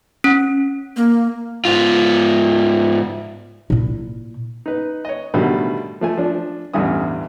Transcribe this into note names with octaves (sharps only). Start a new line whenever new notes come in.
C#4
A#3
G#2 F4
A#2 E4
D#4 B4
C#5 D#5
B2 D3 D#3 G3 A3
F3 A3 G#5
F3 D4
A1 E2 G2 D3 G3 D#6